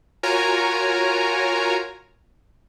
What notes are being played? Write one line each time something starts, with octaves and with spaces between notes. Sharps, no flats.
F4 F#4 A#4 C#5 G#5 A#5